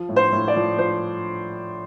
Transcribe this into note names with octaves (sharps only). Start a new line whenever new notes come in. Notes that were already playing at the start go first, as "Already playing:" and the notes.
Already playing: F3
A2
C5
A2
D5
F3
F3 C5